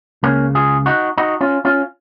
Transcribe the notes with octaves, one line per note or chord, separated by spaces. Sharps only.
C#2 C#3 A#3 C#4
F4 G#4
D#4 F#4
D#4 F#4
C#4 F4
C#4 F4